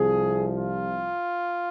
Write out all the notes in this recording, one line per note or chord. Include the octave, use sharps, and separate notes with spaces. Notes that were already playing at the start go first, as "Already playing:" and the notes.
Already playing: C2 C3 F3 G#4
F4